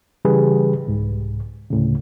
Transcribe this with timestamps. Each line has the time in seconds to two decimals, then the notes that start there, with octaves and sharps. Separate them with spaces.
0.25 C#3 E3 G3 G4 G#4 B4
0.87 C2 G#2
1.71 D2 A2 C#3